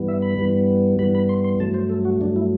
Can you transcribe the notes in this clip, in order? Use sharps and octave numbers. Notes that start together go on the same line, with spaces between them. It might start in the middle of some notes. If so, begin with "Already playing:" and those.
Already playing: G2 E3 G3 B3
E5
B5
G2 E3 G3 B3
G2 E3 G3 B3 B5
B5
C6
C6
G2 F#3 A3 A5
C5
A4
F#4
G2 F#3 A3 D4
E4